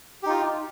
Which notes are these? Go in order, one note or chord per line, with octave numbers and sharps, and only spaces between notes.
D#4 F4 G4